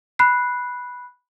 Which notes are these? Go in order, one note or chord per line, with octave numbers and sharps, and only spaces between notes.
B5 F#6 C7